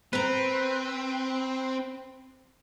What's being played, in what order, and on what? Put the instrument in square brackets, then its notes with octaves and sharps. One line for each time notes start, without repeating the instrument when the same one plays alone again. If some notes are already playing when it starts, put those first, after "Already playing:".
[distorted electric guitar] C4 [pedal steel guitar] B4 [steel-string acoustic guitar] C5 A#5